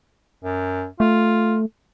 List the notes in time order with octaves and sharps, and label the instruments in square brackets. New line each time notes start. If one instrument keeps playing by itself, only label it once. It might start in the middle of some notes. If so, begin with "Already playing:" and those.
[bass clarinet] F#2
[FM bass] A3 [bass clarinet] F4